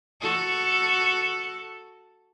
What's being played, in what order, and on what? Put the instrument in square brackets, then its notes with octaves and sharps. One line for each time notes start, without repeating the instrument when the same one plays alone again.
[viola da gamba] F#4 A4